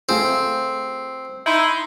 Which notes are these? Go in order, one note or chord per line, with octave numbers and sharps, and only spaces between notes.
A3 C4 F4 G#4
D#4 E4 C6